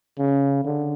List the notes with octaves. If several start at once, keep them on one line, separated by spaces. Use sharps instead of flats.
C#3
D3